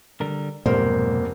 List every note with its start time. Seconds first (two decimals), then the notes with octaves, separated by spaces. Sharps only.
0.21 D3 G3 A#4
0.66 F1 B1 G#2 A#3 A#4 C5